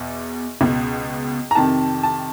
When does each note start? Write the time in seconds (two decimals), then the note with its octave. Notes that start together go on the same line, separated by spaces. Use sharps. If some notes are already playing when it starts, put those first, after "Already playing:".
Already playing: E2 B2
0.61 C#2 B2
1.51 A#5
1.55 F2 C3 D#3 A5
2.03 A5